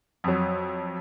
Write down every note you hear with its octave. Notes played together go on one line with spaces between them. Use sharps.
F2 F#3